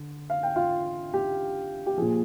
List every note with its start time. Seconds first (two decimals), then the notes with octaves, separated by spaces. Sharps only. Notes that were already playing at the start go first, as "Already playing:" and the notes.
Already playing: D3
0.30 F5
0.43 G5
0.56 F4 F5
1.14 G4
1.86 G4
1.97 A#2 F3 G#4